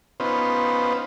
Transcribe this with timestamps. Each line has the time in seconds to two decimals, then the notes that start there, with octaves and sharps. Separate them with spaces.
0.20 B3 C#4 D#4 F4 B4 C5